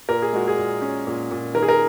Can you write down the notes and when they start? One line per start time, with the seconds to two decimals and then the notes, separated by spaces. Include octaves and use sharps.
0.09 A#2 A#4
0.22 G#4
0.33 G#3 F#4
0.48 G#4
0.58 A#2
0.82 C#4
1.07 A#2
1.31 A#2
1.55 D#3 A#4
1.63 G#4
1.68 A#4